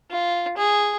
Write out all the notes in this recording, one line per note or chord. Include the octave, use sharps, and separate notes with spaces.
F4
G#4